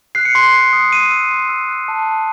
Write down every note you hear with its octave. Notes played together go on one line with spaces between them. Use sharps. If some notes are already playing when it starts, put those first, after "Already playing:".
F#6 C7
C#7
C6 C7
C6
D#6
C6 D#7
E6
C6
E6
F#6
A5
A5